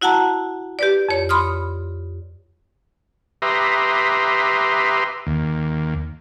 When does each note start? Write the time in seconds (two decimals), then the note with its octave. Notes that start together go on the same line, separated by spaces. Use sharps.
0.01 E4 F#4 F#5 A5 A#5
0.79 G4 B4 D5
1.09 F2 C#5
1.29 B5 C6 D#6 F6
3.42 G4 B4 E5 A#5 C6 D#6
5.27 D#2